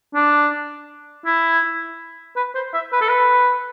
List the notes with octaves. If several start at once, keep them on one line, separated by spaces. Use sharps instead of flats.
D4
E4
B4
C5
E5
B4
A4
B4